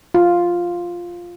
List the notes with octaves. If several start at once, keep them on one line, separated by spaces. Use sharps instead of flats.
F4